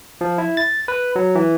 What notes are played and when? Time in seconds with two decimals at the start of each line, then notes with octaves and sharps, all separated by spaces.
0.21 F3
0.38 E4
0.57 A6
0.88 B4
1.16 F#3
1.35 E3